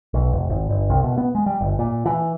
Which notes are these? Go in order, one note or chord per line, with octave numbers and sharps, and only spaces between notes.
B1
F1
G#1
G1
C2
B2
B3
G#3
G3
G1
A#2
E3